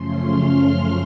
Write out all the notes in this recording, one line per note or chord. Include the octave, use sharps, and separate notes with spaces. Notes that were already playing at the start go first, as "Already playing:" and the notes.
Already playing: F#2 C#3 F3 A3 C#4 C6
F6